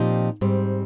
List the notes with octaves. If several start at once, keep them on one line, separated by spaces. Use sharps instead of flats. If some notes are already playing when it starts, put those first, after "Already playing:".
Already playing: A#2 F3 C4 D#4 G4
G#2 G3 C4